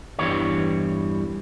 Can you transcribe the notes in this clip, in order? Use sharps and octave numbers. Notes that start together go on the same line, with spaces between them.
E2 G2 E3 G3 C#5